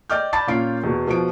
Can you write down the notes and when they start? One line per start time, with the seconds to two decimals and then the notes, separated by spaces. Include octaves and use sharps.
0.10 D5 D#5 G5 D6 F6 G6
0.33 D5 A5 B5 D6 D#6 A6
0.47 A#2 A#3 C#4 F4 C7 D7
0.83 E2 B2
1.07 B2 F3 D7